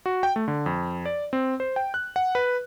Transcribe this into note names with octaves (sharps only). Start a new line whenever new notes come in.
F#4
G5
A3
D3
F2
D5
C4
C5
G5
F#6
F#5
B4